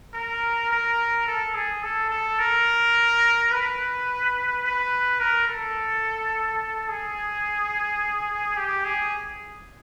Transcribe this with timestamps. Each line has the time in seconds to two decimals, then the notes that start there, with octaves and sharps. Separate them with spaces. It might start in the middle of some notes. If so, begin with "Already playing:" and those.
0.14 A#4
0.71 A#4
1.27 A4
1.54 G#4
1.83 A4
2.10 A4
2.39 A#4
3.51 B4
4.64 B4
5.20 A#4
5.48 A4
6.88 G#4
8.56 G4
8.84 G#4